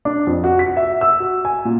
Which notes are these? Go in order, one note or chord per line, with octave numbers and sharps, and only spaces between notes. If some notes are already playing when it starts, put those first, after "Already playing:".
D4
F2
F#4
B6
E5
E6
F#4
G#5
A#2